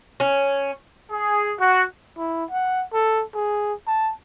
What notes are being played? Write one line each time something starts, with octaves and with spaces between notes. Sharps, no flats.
C#4
G#4
F#4
E4
F#5
A4
G#4
A5